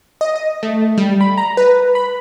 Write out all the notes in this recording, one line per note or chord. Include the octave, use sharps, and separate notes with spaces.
D#5
D#5
A3
G3
B5
A#5
B4
B5